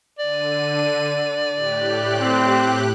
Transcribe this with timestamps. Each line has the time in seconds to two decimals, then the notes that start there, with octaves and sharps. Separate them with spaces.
0.19 D3 D5 D#7
1.55 A2 G4 F#6
2.20 C4